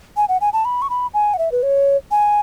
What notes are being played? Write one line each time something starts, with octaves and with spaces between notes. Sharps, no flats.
G#5
F#5
G#5
A5
B5
C#6
B5
G#5
F#5
E5
B4
C#5
G#5